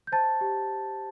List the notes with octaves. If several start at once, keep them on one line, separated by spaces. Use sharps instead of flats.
G6
C5 A5 A6
G4